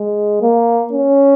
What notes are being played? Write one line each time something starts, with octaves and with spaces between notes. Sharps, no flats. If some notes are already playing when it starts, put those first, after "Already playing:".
Already playing: G#3
A#3
C#4